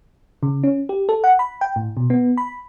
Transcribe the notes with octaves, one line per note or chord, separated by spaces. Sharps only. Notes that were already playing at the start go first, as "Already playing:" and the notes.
C#3
C#4
G4
A4
F#5
B5
G5
A2
B2
B3
B5